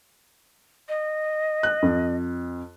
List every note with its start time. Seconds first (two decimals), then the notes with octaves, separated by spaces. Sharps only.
0.89 D#5
1.63 F#6
1.82 F2